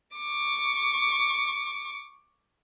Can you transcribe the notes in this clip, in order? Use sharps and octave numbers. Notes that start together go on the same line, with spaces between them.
C#6 D6